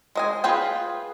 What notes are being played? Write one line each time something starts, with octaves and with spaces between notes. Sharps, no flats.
G#3 D#5 G#5
F4 G#4 B4 G5